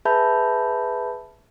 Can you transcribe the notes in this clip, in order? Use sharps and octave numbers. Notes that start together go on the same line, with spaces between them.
G#4 B4 E5 A5 B5 G6